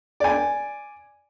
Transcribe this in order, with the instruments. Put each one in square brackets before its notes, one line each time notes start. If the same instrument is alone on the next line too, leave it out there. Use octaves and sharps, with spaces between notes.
[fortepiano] D5 G#5